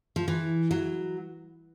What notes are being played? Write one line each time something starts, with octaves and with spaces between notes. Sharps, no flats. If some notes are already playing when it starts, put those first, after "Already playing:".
F3
E3
F#3